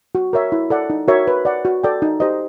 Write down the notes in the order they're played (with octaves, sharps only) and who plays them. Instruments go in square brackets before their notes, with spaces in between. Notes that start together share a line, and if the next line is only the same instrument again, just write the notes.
[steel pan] F#4
A#4 C#5 E5
E4
A4 D5 F#5
D#4
F#4 A#4 C#5 E5
B4
D5 F#5
F#4
A4 D5 G5
D#4
G4 C5 D#5